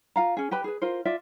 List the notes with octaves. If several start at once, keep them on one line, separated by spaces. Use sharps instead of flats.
F4 F5 A#5
C#4 G#4
G4 B4 B5
G#4 B4
F4 A#4 C5
F4 D5 E5